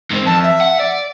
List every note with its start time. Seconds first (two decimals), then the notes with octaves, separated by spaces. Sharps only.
0.10 G#2 C4
0.26 F2 A5
0.43 E5
0.61 F#5
0.80 D5